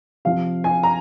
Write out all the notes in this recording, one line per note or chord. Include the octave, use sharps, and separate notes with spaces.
C3 F3 F5
G#5
A#5